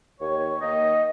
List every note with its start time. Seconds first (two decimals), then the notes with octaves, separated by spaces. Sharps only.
0.20 D#2 C#5
0.61 D#3 A#3 D#5